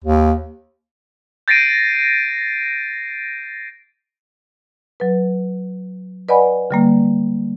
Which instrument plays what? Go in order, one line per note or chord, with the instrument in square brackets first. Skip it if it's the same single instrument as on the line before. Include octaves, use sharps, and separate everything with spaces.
[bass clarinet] D#2
[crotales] G6 A6 A#6 C7 D7 D#7
[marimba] F#3 B4
B4 D5 D#5 F#5 G#5 B5
D3 G3 A#3